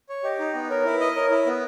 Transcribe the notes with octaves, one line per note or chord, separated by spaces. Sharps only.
C#5
G4 D#5
D#4
B3
A#4 C#5
E4
B4
D#5
A#4 C#5
E4
B3